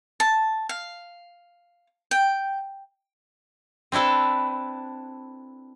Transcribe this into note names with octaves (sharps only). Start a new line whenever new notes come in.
A5
F5
G5
C4 D4 E4 A4 B4